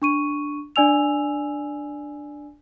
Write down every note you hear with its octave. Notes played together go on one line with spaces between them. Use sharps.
D4 C#6 D#7
D4 D5 G#5 E6 F7